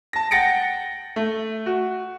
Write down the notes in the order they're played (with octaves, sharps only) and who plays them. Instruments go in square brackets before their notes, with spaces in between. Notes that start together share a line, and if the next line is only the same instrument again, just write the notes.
[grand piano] A5 A#6
F#5 G5 A6 A#6 C#7 D7
A3
F#4